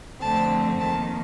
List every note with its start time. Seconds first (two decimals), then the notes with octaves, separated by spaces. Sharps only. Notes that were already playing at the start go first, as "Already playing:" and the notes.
0.20 F2 D3 A3 C4 A5
0.79 F2 D#3 A#3 A5